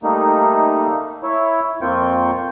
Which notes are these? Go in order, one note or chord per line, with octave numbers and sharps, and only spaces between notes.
G3 A3 A#3 D#4
E4 C#5
F2 A#3 C4 F4 G5 C#6